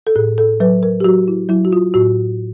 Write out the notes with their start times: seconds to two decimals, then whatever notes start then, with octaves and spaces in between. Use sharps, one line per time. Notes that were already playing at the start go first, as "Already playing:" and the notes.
0.07 A4
0.16 A2 G#4
0.38 A4
0.60 F#3 B4
0.83 A#4
1.00 G4
1.04 F#3 F#4
1.28 E4
1.49 F#3 E4
1.65 F#4
1.73 F4
1.94 A2 F#4